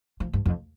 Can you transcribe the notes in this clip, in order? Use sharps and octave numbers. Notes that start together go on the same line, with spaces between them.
F3
G2
F2